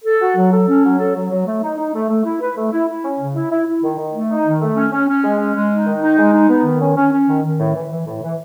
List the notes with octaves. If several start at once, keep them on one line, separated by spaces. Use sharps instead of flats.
A4
F#4
F#3
A4
C#4
F#3
A4
F#3
F#3
A3
D#4
D#4
A3
A3
E4
B4
A3
E4
E4
C#4
C#3
E4
E4
E4
D#3
D#3
A3
D#4
D#3
A3
C#4
C#4
C#4
G#3
C#4
G#3
D#4
D#3
D#4
G#3
D#4
B3
D#3
C#4
C#4
C#4
D#3
D#3
A2
E3
E3
A2
E3